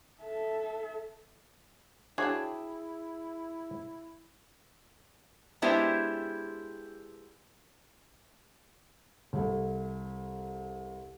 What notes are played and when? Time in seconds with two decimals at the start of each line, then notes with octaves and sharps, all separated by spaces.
0.22 A4 E5
2.18 D4 E4 F#4 G#4 C#5 G5 A5 G#6
5.62 G#3 B3 D4 E4 G4 C5
9.33 C2 A4